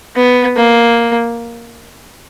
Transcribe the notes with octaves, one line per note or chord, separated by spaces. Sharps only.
B3
A#3